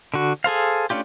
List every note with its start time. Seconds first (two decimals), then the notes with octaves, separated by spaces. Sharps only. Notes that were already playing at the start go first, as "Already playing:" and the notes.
0.14 D3 F#4
0.44 G#4 A4 C5 F5
0.90 A3 C#4 D4 F4 G4